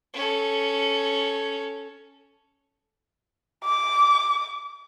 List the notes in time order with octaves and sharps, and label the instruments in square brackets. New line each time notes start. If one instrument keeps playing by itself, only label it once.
[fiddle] C#4 A4
[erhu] D6